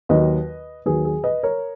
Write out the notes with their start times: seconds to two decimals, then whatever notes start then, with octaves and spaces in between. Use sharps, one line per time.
0.09 D#2 D#3 F#3 B4 D#5
0.86 D#2 D#3 F#3 G#4 B4
1.05 G#4
1.24 B4 D#5
1.43 A#4 C#5